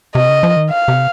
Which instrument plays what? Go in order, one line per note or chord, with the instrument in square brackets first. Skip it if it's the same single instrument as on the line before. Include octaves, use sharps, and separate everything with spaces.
[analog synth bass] C3 [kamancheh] D#5
[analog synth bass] C#3
F3
D#3
[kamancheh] F5
[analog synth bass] C3